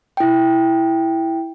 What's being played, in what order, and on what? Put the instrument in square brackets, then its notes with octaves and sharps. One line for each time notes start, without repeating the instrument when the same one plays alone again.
[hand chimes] E4 G5